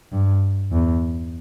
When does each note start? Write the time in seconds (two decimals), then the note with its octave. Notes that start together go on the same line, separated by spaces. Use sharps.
0.12 G2
0.72 E2